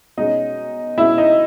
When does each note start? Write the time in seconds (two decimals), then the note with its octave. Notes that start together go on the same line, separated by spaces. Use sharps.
0.17 B2 G#3 C#4 D#4 D#5
0.98 B2 G#3 C#4 E4 E5
1.18 D#4 D#5